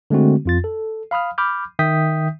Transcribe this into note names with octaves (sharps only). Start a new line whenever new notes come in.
D3 G#3 A3 C4 F#4
F2 F4 A6
A4
F5 B5 D#6 F6
B5 D6 F6 G6
D#3 E5 G5 D#6 G6 B6